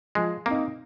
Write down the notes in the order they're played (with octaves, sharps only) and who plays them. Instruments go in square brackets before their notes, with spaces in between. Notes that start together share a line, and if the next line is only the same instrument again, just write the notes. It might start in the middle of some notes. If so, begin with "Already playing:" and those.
[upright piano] F3 [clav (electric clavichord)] G#3
[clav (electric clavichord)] A#3 [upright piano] C4 D#4